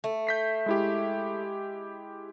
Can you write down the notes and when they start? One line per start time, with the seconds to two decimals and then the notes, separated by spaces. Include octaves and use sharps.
0.04 A3
0.27 G6 B6 C7
0.66 G#3 E4 G4